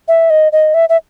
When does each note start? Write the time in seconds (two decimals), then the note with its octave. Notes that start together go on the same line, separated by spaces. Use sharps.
0.08 E5
0.30 D#5
0.52 D#5
0.74 E5
0.89 E5